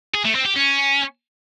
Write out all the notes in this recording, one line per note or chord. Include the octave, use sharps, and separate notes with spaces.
G#4
A3
C4
G4
C#4